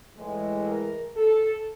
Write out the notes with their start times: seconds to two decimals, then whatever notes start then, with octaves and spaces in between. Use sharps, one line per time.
0.16 A2 E3 G#3
0.66 A#4
1.15 A4